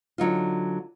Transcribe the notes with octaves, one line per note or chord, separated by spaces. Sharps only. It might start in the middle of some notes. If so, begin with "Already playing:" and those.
D3 F#3 D#4 F4